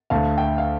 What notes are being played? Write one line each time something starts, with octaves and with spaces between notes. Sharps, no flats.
D2 D3 A3 F5 A5
E5 G5
F5